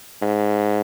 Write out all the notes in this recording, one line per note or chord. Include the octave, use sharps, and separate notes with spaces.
G#2